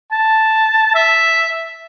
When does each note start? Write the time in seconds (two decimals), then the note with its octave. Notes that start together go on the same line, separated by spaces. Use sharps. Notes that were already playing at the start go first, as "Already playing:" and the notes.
0.12 A5
0.95 E5